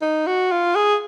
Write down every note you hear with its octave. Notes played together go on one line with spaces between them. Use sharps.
D#4
F#4
F4
G#4